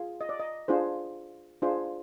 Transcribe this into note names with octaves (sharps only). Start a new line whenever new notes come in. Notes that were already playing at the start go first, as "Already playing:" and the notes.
Already playing: F4 G#4
D#5
D5
D#5
D4 F4 G#4 C5
D4 F4 G#4 C5